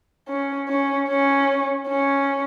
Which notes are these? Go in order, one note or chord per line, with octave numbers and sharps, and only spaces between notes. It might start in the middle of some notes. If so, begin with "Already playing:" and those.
C#4
C#4
C#4
C#4